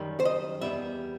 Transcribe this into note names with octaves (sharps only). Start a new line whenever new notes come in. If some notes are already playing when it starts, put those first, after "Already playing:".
Already playing: F#2 D#3 G3
C5
D#5
E2 D#3 G3 B3 E5